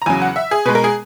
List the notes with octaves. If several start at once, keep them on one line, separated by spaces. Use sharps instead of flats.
A#5
E2 C#3 F#3 G#5
F#5
E5
G#4
B2 G#3 B4
A#4
G#4